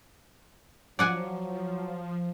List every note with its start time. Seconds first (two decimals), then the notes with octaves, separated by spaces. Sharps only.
0.99 F3 F#3 D5 F#5 G#5